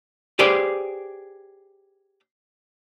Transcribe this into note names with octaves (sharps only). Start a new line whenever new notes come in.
G4 G#4 B4 C5 D5